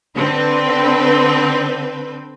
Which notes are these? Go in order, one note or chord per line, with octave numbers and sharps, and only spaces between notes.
D3 C4 B4